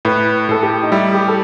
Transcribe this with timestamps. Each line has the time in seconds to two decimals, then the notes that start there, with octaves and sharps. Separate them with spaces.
0.05 A2 B4
0.49 A2 A4
0.63 G4
0.83 D#4
0.92 G3 E4
1.14 G4
1.28 A4